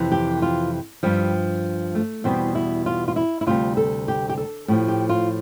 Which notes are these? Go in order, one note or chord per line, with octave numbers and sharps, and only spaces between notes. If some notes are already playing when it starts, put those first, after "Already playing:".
Already playing: F2 C3 E3
G4
F4
G2 F3 G3
A3
E2 B2 G3 C4
E4
F4
F4
E4
E4
D2 C3 G3 F4
A4
G4
G4
A4
A2 F3 G4
G4
F4